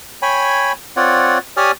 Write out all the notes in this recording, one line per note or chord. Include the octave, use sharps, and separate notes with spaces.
C#5 G5 G#5 B5
C4 F4 C#5 D5 F#5
G4 C#5 D5 G#5 D#6 F6